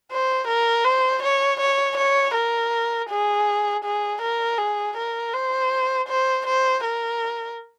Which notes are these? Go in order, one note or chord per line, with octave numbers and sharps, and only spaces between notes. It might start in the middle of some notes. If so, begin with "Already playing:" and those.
C5
A#4
C5
C#5
C#5
C#5
A#4
G#4
G#4
A#4
G#4
A#4
C5
C5
C5
A#4